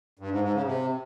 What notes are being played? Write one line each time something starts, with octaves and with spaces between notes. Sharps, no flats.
G2
G#2
G#2
C#3
C3